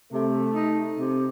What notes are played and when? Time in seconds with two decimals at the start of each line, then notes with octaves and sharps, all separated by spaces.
0.12 C3 A3
0.54 D#4
0.98 C3